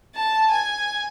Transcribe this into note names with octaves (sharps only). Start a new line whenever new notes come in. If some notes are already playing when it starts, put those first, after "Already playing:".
A5
G#5